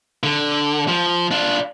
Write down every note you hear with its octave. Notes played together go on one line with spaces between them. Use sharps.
D3
F3
D4 F4